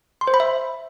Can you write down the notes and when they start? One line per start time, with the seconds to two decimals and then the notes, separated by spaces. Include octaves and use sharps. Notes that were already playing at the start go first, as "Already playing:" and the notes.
0.21 C6
0.27 C5
0.34 B5
0.40 E5